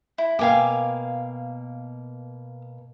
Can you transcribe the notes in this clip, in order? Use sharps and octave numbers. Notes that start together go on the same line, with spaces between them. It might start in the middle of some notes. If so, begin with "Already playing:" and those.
E4
B2 A#3 F5 G5 G#5 D6